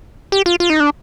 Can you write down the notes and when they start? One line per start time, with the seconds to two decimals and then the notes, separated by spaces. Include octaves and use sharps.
0.32 G4
0.46 F4
0.60 F4
0.70 D#4
0.80 D4